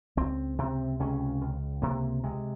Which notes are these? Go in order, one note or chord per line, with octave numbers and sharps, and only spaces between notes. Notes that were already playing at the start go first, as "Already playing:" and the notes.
C#2 C4
C3 C4
C#2 C#4
C#2
C3 A#3
C3 G#3